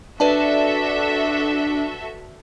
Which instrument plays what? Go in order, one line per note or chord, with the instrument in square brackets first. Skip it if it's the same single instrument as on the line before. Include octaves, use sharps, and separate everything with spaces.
[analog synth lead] D4 [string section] F#4 A4 E5 [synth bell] B4 D5 A5